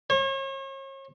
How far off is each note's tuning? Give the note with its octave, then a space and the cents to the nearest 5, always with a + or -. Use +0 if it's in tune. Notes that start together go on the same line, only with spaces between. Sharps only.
C#5 -40